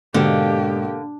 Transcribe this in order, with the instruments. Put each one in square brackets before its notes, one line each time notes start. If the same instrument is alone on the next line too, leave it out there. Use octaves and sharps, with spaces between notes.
[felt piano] G#2 B2 [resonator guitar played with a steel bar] D3 [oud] A#3 D4 A4 [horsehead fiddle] G4